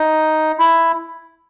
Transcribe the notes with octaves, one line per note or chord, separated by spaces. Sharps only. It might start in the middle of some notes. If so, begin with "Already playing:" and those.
Already playing: D#4
E4